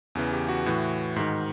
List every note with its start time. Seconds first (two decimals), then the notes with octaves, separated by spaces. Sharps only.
0.15 E2 C#3 E3
0.33 G4
0.49 F#4
0.66 A2 E3
1.16 G#2 D#3